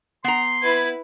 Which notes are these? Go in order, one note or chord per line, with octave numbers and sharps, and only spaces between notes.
B3 A#5 C6
E4 B4 G#6